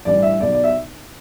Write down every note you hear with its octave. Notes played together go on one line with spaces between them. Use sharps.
A1 G2 E3 D5
E5
B1 B2 D5
D5
E5